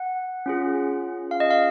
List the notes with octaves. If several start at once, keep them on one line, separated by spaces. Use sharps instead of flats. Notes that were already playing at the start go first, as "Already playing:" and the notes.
Already playing: F#5
C#4 F4 G#4
F5
D#5
F5